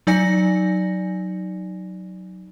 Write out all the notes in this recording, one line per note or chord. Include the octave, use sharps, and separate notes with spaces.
F#3 D#4 D5 G#5 A#6 C#7